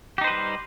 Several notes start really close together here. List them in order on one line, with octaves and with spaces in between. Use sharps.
G4 D#4 C5 B4 G3